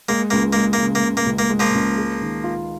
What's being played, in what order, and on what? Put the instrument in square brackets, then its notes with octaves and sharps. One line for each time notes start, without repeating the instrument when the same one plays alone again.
[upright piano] G#3 [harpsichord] A#3
[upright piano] C#2 [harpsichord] A#3
[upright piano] G#3 [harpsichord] A#3
[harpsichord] A#3
[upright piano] C#3
[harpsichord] A#3
[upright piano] C#3
[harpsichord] A#3
[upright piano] C#2
[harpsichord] A#3
[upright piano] G#3
[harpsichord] F3 A#3
[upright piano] C#2
G#4
D#3
F4